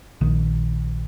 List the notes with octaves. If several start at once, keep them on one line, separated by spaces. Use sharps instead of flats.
A#1 D#3